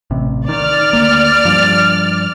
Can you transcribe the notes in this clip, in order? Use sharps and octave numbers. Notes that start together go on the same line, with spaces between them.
A1 C3
D#3 D5 F6
D2 A#3
G2 F3